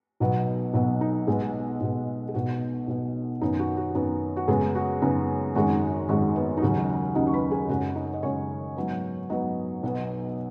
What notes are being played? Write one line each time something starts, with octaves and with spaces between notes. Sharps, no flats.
B1 B2 F#3 B3
B1 B2 F#3 B3
D#4
B1 B2 G#3 B3 G#4
B1 B2 B3
G#4
B1 B2 B3 F#4
B1 B2 B3
F#2 D#3 B3 D#4
F#4
F#4
F#2 D#3 B3
F#4
F#2 C#3 G#3 B3 G#4
F#4
F#2 C#3 B3 D#4
G#1 F#2 D#3 G#3 F#4
G#1 F#2 D#3 G#3 F#4
B3 B4
D#4
D#2 C#3 F#3 C#4 F#4
D#4
F#4
D#2 C#3 F#3 C#4 D#4 D#5
C#6
B4 B5
G#4 G#5
F#2 C#3 G#3 F#4 F#5
D#4 D#5
D#5
F#2 C#3 G#3 C#4 C#5
G#2 F#3 B3
G#2 F#3 B3 D#4 D#5
B1 B2 F#3 B3